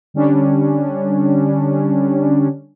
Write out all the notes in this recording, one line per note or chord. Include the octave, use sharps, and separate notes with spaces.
D3 G3 C#4 D4